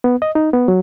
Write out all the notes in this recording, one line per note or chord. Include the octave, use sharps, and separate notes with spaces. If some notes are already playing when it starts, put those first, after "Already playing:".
B3
D#5
D#4
B3
F#3